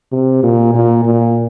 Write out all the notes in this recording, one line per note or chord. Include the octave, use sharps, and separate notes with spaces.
C3
A#2
A#2
A#2